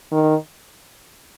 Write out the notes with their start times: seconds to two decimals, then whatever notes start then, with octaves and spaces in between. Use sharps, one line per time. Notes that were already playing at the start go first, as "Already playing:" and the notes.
0.12 D#3